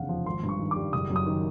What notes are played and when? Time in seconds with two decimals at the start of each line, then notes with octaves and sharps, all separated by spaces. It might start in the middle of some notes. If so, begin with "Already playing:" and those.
Already playing: F1 E2 C#3 F5 F#5
0.09 F3
0.26 G#1 C6
0.43 G2
0.49 C#6
0.59 D#3
0.71 G3 D6
0.93 F#1 D#6
1.10 F#2
1.16 D#6
1.26 D#3